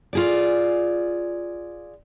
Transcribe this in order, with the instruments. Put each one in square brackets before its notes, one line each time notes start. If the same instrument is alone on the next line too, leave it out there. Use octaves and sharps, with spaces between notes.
[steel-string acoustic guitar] F4 G#4 D5